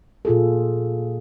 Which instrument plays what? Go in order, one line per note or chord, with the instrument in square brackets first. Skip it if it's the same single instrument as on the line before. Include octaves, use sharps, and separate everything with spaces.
[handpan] A#2 F4 G#4 A4